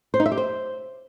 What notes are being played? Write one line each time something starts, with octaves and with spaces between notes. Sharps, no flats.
C5
D#4
E5
G4
C5